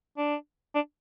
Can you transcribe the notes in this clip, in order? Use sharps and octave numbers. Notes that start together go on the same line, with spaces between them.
D4
D4